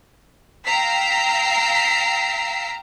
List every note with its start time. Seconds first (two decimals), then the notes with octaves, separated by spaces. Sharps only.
0.65 F5 G5 A#5 E6 B6 C7